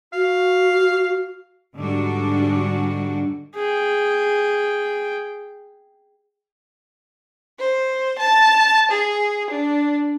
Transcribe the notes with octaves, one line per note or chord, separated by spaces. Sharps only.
F#4 F5
G#2 D3 G3 D4 F#4
G#4 G5
C5
A5
G#4
D4